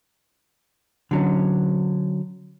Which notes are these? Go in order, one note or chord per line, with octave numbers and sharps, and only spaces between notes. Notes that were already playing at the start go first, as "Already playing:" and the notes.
D3 F#3 C#4